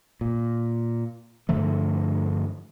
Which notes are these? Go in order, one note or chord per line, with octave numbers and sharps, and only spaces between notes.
A#2
G2 D3 F3 A3